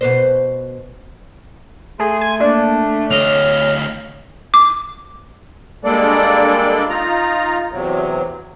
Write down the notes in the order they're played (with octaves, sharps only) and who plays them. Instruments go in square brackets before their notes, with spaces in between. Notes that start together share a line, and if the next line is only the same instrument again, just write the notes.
[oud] B2 B4 C5
[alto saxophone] A3 [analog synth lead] G#4 [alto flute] C6
[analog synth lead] G#5
[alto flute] A#3 [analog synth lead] D4
[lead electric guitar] D2 D#5 [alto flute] C#5 [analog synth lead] F6
[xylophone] D6
[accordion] G3 G#3 A#3 D4 A4 D5
D#4 F4 A#5
E2 C3 F#3